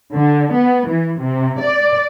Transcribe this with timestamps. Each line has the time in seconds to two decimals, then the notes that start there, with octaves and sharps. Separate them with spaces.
0.14 D3
0.53 B3
0.87 E3
1.21 C3
1.60 D5